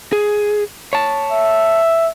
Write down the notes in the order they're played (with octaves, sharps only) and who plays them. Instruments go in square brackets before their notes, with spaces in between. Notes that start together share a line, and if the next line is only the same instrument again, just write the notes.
[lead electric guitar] G#4
C#5 A5
[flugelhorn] E5